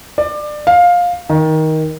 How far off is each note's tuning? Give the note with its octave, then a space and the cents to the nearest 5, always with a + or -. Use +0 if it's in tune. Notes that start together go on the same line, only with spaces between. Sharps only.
D5 +25
F5 +15
D#3 +15